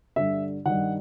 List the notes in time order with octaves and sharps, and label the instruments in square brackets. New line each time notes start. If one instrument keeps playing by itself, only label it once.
[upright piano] G2 D3 E5
G2 D#3 F#5